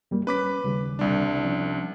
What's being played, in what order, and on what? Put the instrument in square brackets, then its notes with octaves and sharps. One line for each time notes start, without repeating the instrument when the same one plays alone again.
[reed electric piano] F#2 G3 A#3
[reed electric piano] C#4 [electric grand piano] B4 D6 B6
[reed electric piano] D#2 C#3 G3
[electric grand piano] C2 D4
[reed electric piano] F3 C#4